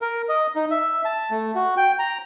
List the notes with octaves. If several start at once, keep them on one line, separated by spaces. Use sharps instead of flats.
A#4
D#5
D#4
E5
A5
A3
F#4
G5
A#5